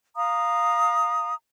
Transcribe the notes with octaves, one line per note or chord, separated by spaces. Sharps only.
F5 A#5 D#6